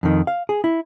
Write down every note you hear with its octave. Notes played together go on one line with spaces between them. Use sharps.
F2 D#3
F5
G#4
E4